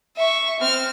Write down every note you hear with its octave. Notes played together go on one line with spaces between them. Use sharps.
E5 C#6
C4 F6